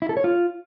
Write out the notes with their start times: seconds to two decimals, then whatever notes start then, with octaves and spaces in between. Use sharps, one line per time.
0.02 E4
0.09 A4
0.17 C#5
0.24 F4